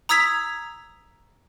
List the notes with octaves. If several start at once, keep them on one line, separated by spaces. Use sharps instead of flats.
A#5 D#6 E6 G#6 B6 F7